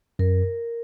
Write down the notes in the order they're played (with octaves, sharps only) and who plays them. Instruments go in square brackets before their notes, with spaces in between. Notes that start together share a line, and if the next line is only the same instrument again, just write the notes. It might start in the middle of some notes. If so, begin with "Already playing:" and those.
[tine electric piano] F#2 [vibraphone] A#4